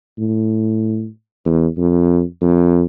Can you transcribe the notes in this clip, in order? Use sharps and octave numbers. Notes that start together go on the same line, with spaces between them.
A2
E2
F2
F2